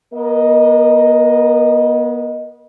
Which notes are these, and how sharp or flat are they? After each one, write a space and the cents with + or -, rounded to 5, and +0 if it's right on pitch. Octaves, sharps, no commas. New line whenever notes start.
B3 -35 A#4 +0 D#5 +0